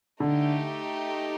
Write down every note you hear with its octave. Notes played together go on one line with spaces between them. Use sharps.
D3 A3 D#4 G4